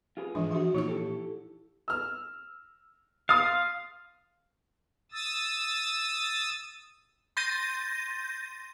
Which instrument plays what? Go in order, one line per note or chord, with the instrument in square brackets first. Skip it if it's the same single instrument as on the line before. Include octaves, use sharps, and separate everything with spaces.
[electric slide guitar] F4 G#4 B4
[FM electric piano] G#2 [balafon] E3 F3 D4
[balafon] E3 F3 D4 [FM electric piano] F#4 E5
[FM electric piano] A#2 [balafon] D#4 F4 C#6 [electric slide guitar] C#5
[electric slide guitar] E4 G4 A4
[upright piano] E6 F6
[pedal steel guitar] F5 [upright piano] C6 D#6 A6
[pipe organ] D#6 E6 A6
[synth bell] C6 G6 A6 A#6 D#7